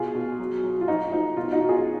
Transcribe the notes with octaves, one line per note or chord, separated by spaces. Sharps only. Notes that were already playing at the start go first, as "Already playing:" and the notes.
Already playing: B2 F4 G#4
B2
F#3
F#3
F4
F3 D#4 F#4
F3 D#4
B2 F4
D#4 F#4
B2
F4 G#4